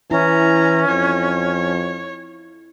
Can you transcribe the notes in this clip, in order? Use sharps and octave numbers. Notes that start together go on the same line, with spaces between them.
E3 C#4 E4 A#5
F2 C#5